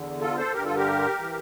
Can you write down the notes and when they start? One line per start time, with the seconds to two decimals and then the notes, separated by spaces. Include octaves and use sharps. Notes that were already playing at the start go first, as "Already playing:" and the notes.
Already playing: E2 D3
0.21 F4 A4
0.38 A4 C5
0.54 G2 D3 G4 A#4
0.65 F4 A4
0.76 G4 A#4
1.20 E3